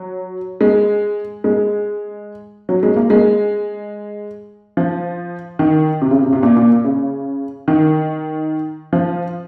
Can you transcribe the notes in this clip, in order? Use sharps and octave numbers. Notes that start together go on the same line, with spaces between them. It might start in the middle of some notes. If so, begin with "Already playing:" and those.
Already playing: F#3
G#3
G#3
F#3
G#3
A#3
G#3
F3
D#3
C3
C#3
C3
C3
A#2
A#2
C#3
D#3
F3